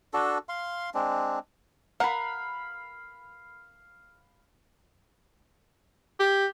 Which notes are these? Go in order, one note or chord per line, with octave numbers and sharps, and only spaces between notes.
D4 F#4 A4
F5 C6
G#3 C4 D4
A#4 F5 F#5 B5
G4